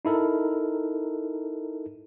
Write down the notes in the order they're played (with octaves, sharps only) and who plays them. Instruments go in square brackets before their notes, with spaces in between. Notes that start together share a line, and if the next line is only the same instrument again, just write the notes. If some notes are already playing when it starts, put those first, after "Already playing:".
[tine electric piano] D#4 E4 A4 A#4